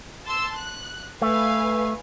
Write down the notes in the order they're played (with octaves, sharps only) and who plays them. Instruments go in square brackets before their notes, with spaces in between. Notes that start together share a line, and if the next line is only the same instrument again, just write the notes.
[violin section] A5 C6 E6
F#6
[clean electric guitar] A3 [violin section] B4 F5 G#5